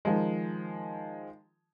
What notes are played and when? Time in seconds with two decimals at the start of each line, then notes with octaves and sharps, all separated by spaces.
0.05 D#3 F3 G#3